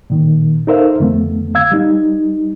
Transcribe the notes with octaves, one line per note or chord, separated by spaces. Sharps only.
A#2 D#3
D#4 A4 A#4 C5 E5 F5
F2 D3 A3 B3
F5 E6 G#6
G3 D#4